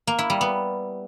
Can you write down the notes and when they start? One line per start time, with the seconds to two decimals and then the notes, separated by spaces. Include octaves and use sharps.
0.07 A#3
0.19 E4
0.30 G3
0.41 B3